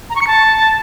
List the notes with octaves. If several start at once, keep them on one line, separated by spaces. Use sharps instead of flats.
A#5
C#6
C#7
A5